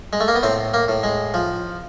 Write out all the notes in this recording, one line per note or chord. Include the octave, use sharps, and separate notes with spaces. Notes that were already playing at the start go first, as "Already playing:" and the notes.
G#3
A3
A#3
B3
A2 C4
A#3
A2
G#3
F3